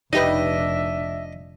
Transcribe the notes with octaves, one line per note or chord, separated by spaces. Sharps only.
F1 D4 D#4 G4 B4 D#5 E5